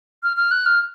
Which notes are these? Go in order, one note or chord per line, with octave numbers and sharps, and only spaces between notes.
F6
F6
F#6
F6